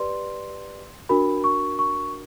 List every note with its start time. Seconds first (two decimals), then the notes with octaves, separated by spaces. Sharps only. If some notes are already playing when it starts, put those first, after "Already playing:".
Already playing: G4 B4 D5 C6
1.09 D4 F#4 A#4 B5
1.44 C#6
1.79 C#6